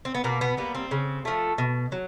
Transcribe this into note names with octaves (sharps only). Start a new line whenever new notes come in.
C4
B3
B2 A#3
B3
G3 A#3 B3
C4
C#3
F3 A3
B2
F#3